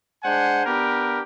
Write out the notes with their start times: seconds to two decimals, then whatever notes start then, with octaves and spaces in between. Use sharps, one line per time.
0.23 G#3 D4 C5 F#5 G#5
0.66 B3 D4 G4 A#4 B4